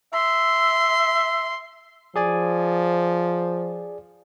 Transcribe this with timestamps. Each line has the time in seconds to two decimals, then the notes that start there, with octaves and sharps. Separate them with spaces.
0.14 E5 C6
2.16 F3 G#4 D5 G#5